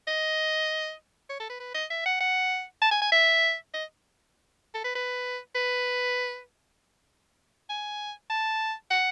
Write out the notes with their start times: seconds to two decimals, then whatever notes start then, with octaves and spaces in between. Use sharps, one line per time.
0.08 D#5
1.29 C#5
1.40 A4
1.50 B4
1.60 B4
1.75 D#5
1.90 E5
2.06 F#5
2.20 F#5
2.81 A5
2.91 G#5
3.02 G#5
3.12 E5
3.73 D#5
4.74 A4
4.84 B4
4.95 B4
5.55 B4
7.69 G#5
8.30 A5
8.91 F#5